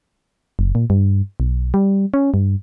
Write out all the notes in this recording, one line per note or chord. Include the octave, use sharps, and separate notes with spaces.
F#1
A#2
G2
B1
G3
C#4
G2